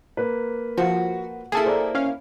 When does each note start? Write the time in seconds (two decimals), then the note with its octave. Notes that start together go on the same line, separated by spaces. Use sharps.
0.17 A#3 B4
0.78 F3 F#4
1.52 A#3 E4 G#4 A4
1.66 C5 D5 A#5
1.95 C#4 F5